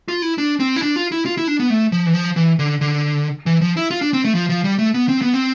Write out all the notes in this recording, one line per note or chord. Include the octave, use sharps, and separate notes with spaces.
F4
E4
D4
C4
E4
D4
F4
E4
F4
E4
D4
B3
A3
F3
E3
F3
E3
D3
D3
E3
F3
E4
F4
D4
C4
A3
F3
F3
G3
A3
B3
C4
B3
C4